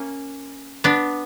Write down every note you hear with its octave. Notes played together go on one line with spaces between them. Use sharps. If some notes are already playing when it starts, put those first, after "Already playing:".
Already playing: A#3 C#4
B3 D4